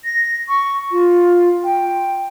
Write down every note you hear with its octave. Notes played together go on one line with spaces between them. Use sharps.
A#6
C#6
F4
G5